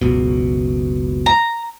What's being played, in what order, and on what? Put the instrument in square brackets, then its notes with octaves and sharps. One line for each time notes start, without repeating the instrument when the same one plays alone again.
[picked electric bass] F#1 C#2 B2
[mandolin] A#5